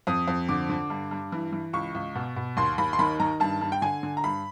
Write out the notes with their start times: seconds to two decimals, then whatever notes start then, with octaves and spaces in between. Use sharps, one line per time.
0.07 F2 D#6
0.28 F2
0.49 D3 D6
0.70 D3
0.90 G2
1.11 G2
1.32 E3
1.53 E3
1.73 C#2 C#6
1.95 C#2
2.15 B2
2.36 B2
2.57 D#2 C6
2.78 D#2 B5
2.93 C6
2.99 D#3 B5
3.20 D#3 A#5
3.40 G2 A5
3.61 G2
3.72 G5
3.82 D3 G#5
4.03 D3
4.17 A#5
4.24 G2 B5